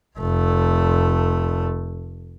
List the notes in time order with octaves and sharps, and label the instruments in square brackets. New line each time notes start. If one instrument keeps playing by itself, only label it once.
[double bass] F1 A3